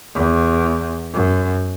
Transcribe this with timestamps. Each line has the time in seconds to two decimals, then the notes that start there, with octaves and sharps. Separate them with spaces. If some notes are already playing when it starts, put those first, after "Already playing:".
0.15 E2
1.14 F#2